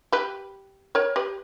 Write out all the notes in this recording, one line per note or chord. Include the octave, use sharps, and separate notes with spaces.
G4 B4
A#4 C#5
G4 B4